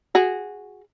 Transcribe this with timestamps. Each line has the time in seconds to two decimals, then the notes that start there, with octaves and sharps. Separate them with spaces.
0.15 F#4 G#4